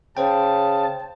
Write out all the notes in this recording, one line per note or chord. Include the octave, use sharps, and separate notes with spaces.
C#3 C5 G5 A5